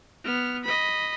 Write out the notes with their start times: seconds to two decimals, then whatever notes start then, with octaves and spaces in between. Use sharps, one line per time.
0.24 B3 F6
0.64 D#5 B5